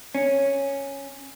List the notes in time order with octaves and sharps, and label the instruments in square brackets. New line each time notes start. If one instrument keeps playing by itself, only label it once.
[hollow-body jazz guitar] C#4